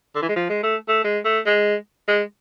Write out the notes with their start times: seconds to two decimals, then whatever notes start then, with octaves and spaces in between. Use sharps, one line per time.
0.15 D3
0.22 E3
0.29 G#3
0.36 F3
0.49 G#3
0.63 A3
0.88 A3
1.04 G#3
1.25 A3
1.46 G#3
2.08 G#3